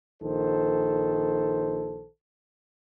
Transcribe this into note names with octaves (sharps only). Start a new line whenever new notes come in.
A#1 D#3 A4 C5